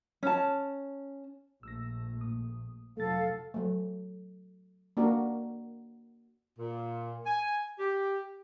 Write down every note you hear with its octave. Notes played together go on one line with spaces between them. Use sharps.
C#4 A5
A#1 A3 E6 A#6
A#2 D#6
F1 F3 F#3 A3 A4 F5 A6
F#3 A3
A#3 D4 F#4 A#4
A#2
G#5
G4